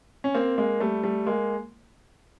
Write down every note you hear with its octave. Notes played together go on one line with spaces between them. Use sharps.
C#4
A#3 C4
G#3 A#3
G3 A3
G3 A3
G#3 A#3